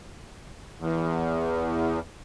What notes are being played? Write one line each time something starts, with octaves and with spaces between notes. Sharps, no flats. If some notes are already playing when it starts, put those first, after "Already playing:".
E2